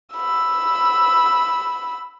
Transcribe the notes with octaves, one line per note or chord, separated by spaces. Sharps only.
B5 E6